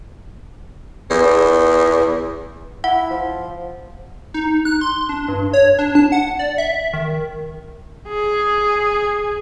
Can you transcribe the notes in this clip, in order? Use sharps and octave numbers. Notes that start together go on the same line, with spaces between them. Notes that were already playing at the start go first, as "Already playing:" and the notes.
E2
E4 F#5
F3
D#4
F#6
C6
D4
G2
C#5
D4
A5
F#5
D5
E5
D#3
G#4